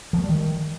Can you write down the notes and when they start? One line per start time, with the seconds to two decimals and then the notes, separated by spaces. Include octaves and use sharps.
0.13 F3
0.18 A3
0.24 G3
0.29 D#3